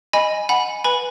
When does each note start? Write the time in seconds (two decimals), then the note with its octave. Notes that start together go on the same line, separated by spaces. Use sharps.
0.13 D#5 G#5 B5
0.49 F#5 G#5 B5
0.84 B4 G#5 B5